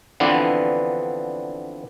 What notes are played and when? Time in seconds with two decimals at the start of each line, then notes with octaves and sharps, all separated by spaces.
0.20 D3 E3 F3 B3 C4 D4